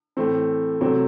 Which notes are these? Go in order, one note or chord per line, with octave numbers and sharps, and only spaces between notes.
A2 E3 A3 C4
C3 F#3 A3 C4